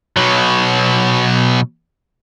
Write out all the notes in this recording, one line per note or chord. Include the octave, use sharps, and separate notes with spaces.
B2 F#3